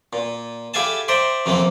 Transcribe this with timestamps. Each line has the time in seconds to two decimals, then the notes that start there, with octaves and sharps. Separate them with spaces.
0.13 A#2
0.74 E4 G4 A4 F5 G#5 A5
1.08 C5 D5 E5 G5 A#5
1.46 F2 C3 E3 A#3 C4